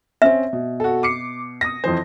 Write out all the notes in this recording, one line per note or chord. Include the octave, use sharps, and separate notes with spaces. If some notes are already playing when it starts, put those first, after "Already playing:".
C4 C#4 E5
B2
F#4 A4
D6 C7 C#7
D#6 A#6
F2 E3 C5